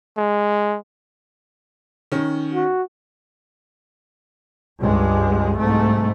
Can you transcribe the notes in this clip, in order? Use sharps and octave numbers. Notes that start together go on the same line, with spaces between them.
G#3
D#3 C#4
F#4
C#2 G2 G#3
C2 G#2 A3